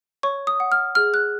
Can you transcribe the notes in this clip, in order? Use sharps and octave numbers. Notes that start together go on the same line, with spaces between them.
C#5 C#6
D#6
F#5
F6
G#4 F6
F#6